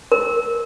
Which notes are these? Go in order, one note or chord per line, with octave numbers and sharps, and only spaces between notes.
A#4